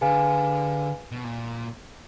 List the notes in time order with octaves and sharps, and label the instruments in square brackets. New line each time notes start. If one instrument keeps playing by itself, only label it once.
[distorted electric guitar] D3 [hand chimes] G#4 B4 F5 G#5
[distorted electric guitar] B2
A#2